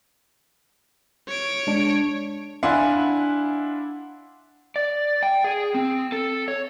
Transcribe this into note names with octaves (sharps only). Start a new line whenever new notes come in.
C#5 D7
G#3 D4
D4 E4 F5 F#5 G#5 C6
D5
G5
G#4
C4
A4
C#5